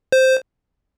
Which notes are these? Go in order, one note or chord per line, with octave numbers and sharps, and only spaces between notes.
C5